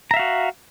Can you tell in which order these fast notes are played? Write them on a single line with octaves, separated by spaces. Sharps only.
A#5 E5 F5 F#4